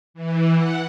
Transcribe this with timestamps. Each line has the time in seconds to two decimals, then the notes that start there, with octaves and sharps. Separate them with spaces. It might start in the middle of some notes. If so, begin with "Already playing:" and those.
0.14 E3
0.54 F#5